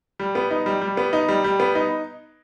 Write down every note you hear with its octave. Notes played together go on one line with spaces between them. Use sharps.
G3
B3
D#4
G3
G3
B3
D#4
G3
G3
B3
D#4